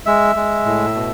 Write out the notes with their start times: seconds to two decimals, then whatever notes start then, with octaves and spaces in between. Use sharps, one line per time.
0.06 G#3 E5
0.36 G#3
0.66 A2
0.95 B2